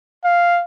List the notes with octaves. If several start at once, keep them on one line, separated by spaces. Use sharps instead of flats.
F5